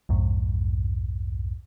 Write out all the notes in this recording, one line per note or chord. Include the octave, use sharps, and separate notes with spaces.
B1 F2 G#2